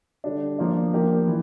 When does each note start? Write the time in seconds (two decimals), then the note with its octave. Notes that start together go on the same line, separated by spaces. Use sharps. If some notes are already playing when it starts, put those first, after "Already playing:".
0.24 D3 G3 D4
0.59 F3 A#3 D4 F4
0.93 F3 A#3 D4 G4 A#4
1.27 E3